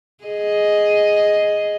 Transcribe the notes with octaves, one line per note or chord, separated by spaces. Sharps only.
G#4 D#5